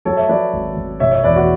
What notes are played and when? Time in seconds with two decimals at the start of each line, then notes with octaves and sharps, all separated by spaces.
0.05 F#3 A4 C#5
0.17 C#5 E5
0.29 F#3 B4 D5
0.53 G#1
0.76 G#1
1.00 B2 C#5 E5
1.11 C#5 E5
1.23 E2 B4 D5
1.36 F#4